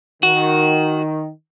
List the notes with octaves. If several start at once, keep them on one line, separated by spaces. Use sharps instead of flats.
D#3 F#4